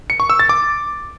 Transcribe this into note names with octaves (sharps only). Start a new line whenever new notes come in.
C#7
C#6
E6
A6
D6